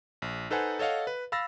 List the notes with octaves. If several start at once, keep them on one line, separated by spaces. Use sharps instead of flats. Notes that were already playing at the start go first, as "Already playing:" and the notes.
A#1
D#4 A4 B4 C5 F#5 G#5
A4 C#5 D#5 F5 F#5
B4
F5 B5 E6 A6 A#6